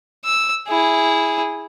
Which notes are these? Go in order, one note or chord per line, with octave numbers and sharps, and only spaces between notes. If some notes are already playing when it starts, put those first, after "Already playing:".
E6
E4 G#4